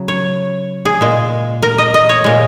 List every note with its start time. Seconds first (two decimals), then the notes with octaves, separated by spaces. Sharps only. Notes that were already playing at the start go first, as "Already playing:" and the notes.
Already playing: C#3 F#3
0.08 C#5
0.85 G#4
1.01 A#2 G#3
1.62 A#4
1.78 D#5
1.94 D#5
2.09 C#5
2.24 A#2 G#3